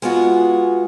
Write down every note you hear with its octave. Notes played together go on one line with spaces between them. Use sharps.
G#3 B3 F4 F#4 G#4